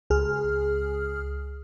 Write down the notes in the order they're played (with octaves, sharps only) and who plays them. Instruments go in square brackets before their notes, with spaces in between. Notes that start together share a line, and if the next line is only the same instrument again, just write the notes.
[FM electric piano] C#2 G#4 F6